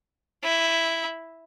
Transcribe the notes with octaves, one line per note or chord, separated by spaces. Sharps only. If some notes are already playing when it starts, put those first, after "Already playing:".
E4